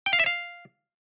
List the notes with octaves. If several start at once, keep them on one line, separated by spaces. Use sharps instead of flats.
G5
F5
E5
F5